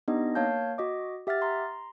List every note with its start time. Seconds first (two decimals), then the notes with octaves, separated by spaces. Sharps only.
0.08 B3 D4 D#4 G4 D#5
0.35 A#3 C#5 F5 A5 G6
0.78 F#4 D#5 D6
1.27 G4 E5 F#5 F6 A6
1.42 A#5 C6